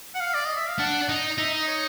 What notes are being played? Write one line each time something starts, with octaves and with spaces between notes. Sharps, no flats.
F#5
F5
D5
D#5
E5
F5
D4 F#5
D#4
D#4 E5
D#5
C#5